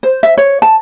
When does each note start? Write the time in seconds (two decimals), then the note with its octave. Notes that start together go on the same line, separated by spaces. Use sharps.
0.03 C5
0.23 E5
0.37 C#5
0.62 A5